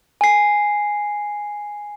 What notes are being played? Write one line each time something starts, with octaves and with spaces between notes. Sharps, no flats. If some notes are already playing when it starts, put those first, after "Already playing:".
G#5 C7